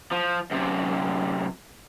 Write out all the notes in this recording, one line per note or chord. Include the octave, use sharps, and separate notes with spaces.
F3
F#2 C3